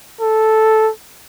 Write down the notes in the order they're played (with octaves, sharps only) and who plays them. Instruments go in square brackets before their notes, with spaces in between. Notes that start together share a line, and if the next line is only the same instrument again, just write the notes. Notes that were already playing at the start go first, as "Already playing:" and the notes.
[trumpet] A4